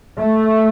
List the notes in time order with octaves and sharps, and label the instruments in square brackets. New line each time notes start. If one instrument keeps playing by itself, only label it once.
[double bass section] A3